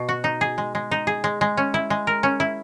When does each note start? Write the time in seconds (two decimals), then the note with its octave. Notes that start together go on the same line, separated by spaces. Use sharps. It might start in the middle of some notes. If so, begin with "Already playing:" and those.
Already playing: B2
0.09 F#4
0.24 D#4
0.41 G#4
0.58 G#3
0.75 G#3
0.91 D#4
1.07 G#4
1.24 G#3
1.41 G#3
1.57 C#4
1.74 E4
1.90 G#3
2.07 A#4
2.23 C#4
2.40 E4